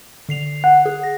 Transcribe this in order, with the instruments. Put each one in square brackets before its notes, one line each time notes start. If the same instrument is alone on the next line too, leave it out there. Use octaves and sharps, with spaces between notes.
[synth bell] D3 C7 F7
[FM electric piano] F#5
[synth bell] G#4
A#6